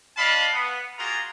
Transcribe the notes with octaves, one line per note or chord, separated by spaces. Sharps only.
D4 F4 D#5 F5 A5 B5
B3
A#3 F4 F#4 G#4 A#5